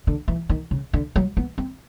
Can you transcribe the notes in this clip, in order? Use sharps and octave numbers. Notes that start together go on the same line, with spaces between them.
D3
E3
D#3
C#3
D3
F#3
B3
C4